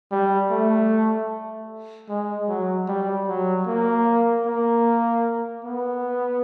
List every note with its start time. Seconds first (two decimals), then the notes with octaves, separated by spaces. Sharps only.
0.12 G3
0.51 A3
2.09 G#3
2.48 F#3
2.88 G3
3.28 F#3
3.67 A#3
4.46 A#3
5.65 B3